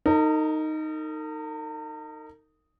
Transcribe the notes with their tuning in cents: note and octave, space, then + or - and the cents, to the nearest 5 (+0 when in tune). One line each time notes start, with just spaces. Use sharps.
D#4 +0 A#4 -45